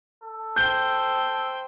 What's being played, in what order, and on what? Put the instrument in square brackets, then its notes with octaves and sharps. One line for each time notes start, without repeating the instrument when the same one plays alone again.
[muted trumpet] A4
[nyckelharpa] C5 G5 [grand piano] G6 G7